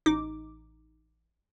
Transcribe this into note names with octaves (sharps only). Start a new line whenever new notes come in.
A1 D#4 D6